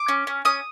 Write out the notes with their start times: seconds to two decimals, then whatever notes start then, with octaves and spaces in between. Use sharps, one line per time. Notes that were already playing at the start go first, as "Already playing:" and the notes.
Already playing: D6
0.08 C#4
0.27 C#4
0.45 C#4 D#6